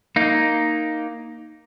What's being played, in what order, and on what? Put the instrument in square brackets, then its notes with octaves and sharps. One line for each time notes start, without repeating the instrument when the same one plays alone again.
[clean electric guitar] A#3 D#4